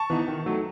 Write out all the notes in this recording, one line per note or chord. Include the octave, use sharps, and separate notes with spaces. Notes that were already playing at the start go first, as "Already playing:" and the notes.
Already playing: A5 C#6
E3 B3 D#4
D#3
F#3 A3